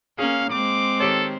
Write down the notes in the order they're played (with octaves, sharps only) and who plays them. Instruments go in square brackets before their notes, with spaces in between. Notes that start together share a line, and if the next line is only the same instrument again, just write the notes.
[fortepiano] A#3 G#4 [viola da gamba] C#4 [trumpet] F5
[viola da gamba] G#3 C4 [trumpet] D6
[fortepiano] D#3 G4 C#5 [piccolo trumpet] A4